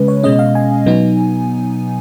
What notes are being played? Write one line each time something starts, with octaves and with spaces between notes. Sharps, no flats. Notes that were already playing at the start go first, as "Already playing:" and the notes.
Already playing: C#3 G#3 C#4 B4
C#5
B2 G#3 C#4 D#5
F5
G#5
B2 F#3 B3 D#4